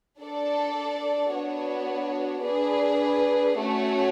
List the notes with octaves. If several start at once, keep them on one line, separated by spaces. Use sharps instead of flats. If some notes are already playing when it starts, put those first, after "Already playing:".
D4 A4 D5
B3 D4 F#4 C#5
D4 G#4 B4 D5
A3 C#4 F#4 C#5